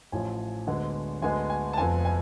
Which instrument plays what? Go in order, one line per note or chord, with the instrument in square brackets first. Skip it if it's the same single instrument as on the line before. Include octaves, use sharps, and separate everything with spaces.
[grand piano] A1 A2 F3 G#5
D2 D3 G#3 B3
D2 D3 G#3 B3 G#5
G#5
A5
F1 F2 F3 B3 G#5
G#5